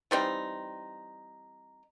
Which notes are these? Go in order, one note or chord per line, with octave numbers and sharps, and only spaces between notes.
E3 G3 C4 D#4